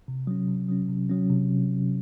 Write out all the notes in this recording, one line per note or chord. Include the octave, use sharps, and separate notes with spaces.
C3
F#3 C#4
C3
F#3 C#4
C3
F#3 C#4
C3